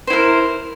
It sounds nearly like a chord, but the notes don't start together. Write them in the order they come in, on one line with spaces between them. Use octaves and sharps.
C5 E4 A#4